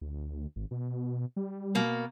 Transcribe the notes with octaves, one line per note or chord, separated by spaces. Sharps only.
D2
G#1
B2
G3
B2 A#3